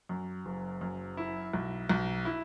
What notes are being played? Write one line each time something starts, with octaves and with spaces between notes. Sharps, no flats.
F#2
F#1
F#2
E4
B1
B1
E4